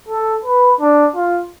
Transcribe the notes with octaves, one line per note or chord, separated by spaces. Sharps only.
A4
B4
D4
F4